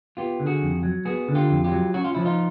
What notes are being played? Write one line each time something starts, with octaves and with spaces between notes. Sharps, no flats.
B3 F4 G4
D3
F#4 G#4
F2
F#3
B3 F#4 G#4
D3
F4 G4
F2
F4 G4
F#3
C#4 F#4
F4
F3 E4
D#4 F4